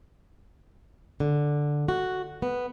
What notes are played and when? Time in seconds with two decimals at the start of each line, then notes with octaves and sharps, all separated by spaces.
1.20 D3
1.88 F#4
2.42 B3